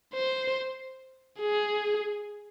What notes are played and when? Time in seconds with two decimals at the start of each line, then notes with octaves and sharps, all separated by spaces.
0.14 C5
1.40 G#4